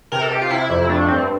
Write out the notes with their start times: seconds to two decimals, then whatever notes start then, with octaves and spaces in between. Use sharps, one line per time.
0.12 C3 A#4
0.21 A4
0.31 C3 G4
0.42 F4
0.50 C3 E4
0.70 F2
0.89 A3 D4
1.08 G2 C4